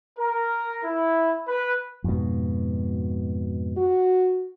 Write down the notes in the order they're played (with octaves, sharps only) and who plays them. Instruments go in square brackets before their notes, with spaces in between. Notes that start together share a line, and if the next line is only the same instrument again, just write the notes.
[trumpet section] A#4
E4
B4
[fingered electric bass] F2 G#2 B2
[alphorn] F#4